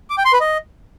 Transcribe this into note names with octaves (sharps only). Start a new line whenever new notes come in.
D6
G5
C6
B4
D#5